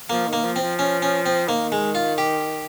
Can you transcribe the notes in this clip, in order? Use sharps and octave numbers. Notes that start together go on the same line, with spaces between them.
F3 A#3
D#3
A#3
F3
C4
F3
C#4
C#4
C4
D#3 A#3
G#3
F4
G4